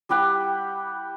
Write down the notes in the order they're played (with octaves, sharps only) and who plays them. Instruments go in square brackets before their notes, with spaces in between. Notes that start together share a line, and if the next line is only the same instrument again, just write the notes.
[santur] G3 E4 G4 F#5